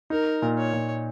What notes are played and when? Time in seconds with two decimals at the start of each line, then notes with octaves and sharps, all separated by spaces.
0.10 D#4 A#4
0.42 A#2
0.58 C#5
0.73 A#2